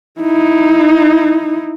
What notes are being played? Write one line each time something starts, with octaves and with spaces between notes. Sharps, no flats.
D#4 E4